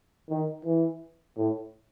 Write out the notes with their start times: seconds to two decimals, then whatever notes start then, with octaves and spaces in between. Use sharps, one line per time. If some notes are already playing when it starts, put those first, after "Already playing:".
0.30 D#3
0.65 E3
1.37 A2